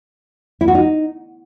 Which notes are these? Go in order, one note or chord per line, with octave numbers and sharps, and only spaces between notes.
E4
F#4
D#4